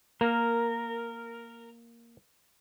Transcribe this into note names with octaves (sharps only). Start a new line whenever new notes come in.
A#3 A#4